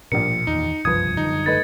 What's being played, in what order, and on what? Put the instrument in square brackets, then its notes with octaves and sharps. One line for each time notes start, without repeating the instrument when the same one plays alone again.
[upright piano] A#1 G3 A#4 [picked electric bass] B2 F3 D4 [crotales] C#7
[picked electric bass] E2 D#3 [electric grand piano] D#4
[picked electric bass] F#1 C2 G2 [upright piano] F3 B4 [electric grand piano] D#6 [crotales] G#6
[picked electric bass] F#2 D3 G3 [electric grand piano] D#4
[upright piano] A3 B4 D#5 [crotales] A6